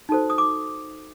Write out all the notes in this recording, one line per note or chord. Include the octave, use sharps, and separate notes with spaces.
D#4 F#4 A4 C5
D#6
D6